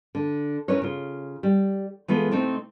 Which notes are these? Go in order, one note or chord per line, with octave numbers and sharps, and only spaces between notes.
D3
C#4 E4 A#4 B4 C#5
C#3 F4
G3
E3 G#3 B3 F4 A4
C3 A3 C4 D#4